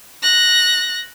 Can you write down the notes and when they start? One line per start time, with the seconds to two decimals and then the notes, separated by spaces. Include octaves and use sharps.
0.23 F#6 A#6